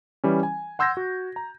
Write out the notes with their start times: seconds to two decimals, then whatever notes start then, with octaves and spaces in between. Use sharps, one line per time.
0.24 E3 G3 C#4
0.43 G#5
0.79 F#5 C6 E6 G6 G#6 A#6
0.97 F#4
1.36 A#5